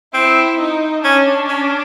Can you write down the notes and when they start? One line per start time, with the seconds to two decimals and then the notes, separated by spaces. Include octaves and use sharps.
0.14 C4 E4
0.58 D#4
1.03 C#4 D4
1.49 C#4